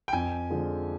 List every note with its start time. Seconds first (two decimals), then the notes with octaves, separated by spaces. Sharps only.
0.08 G5
0.13 F2 G#5
0.50 D3 F3 G#3